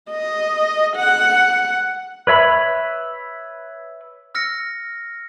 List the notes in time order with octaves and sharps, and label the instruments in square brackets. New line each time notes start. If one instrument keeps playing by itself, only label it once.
[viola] D#5
F#5
[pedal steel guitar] B4 C#5 E5 B5
[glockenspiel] E6 F6 A#6 C#7